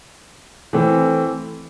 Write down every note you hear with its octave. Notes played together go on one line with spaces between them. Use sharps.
E3 A3 C4